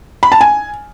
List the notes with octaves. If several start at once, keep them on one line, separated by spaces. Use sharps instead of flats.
B5
A5
G#5